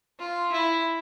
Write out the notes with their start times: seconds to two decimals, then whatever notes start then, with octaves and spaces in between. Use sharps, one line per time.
0.19 F4
0.52 E4